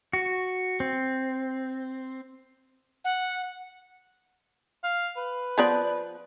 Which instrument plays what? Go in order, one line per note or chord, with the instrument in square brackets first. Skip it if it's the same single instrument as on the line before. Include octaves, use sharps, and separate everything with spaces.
[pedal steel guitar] F#4
C4
[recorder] F#5
[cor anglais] F5
B4
[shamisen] F3 B3 D5